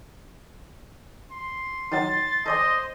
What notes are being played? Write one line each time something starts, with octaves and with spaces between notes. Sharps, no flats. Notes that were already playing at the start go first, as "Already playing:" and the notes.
C6
D#3 F#3 A6
A4 C5 D5 D#5 G#5 C6